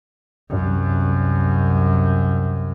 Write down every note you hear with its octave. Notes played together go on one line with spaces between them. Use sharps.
C2 F#2